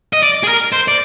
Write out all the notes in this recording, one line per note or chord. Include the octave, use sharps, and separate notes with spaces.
D#5
D5
G#4
A#4
C5
D5